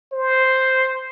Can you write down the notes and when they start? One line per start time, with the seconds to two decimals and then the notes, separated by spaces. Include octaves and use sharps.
0.13 C5